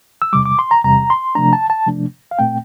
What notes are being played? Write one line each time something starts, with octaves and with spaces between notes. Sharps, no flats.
E6
E2 C3 G3 D6
D6
C6
A#5
E2 C3 G3 A#5
C6
C3 F3 A3 D4 A#5
A5
A5
C3 F3 A3 D4
F5
A#2 A3 C4 G5